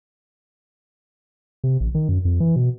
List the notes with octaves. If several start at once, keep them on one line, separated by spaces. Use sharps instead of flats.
C3
A1
D#3
F#2
F2
E3
B2